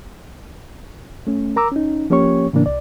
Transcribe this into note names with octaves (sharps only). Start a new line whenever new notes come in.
A3 C#4
A#4 A#5 D6 E6
C#4 D#4
F3 A#3 C#4 G4 C#5 C#6
A2 C#3 E3 A#3 D4
C2 D5